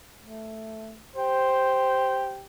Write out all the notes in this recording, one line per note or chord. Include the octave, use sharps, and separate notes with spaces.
A3
G4 C5